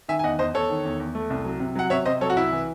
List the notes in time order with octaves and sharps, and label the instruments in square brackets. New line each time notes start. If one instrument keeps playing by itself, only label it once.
[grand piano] D#3 E5 G#5
G#5
E2 D#5 F#5
E2 C5 D#5
E2 A4 C#5
D#3
E2
E2
A3
C2
F#3
C3
F#3 F#5
C3 C#5 E5
C3 C5 D#5
F#3 A4 C#5
F#4
C2 E4
E3